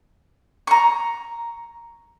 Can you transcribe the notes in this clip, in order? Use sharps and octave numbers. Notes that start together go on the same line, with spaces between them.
A#5 C#6